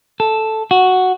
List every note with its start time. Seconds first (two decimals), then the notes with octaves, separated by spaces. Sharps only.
0.20 A4
0.71 F#4